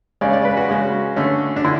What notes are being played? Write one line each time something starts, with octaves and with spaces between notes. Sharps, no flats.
C#3 G#3 C#4 D5
D5
B4
F#4
C#3 G#3 C#4
D3 A3 C#4
D4
D3 E4